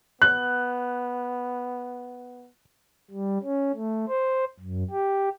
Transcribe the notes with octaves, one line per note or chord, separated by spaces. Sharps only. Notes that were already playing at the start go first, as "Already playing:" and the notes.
B3 F#6
G3
C#4
A3
C5
F#2
G4